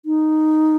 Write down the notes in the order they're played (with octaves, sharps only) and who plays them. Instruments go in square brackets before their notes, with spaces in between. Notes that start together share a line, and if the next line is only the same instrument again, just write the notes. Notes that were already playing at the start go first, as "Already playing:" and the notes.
[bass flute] D#4